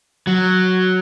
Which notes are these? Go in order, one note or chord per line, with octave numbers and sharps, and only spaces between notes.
F#3